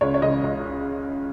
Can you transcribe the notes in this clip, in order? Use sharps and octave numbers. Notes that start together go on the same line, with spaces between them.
C#2 C#5
C#5
C#3 G#3 D#5
C#2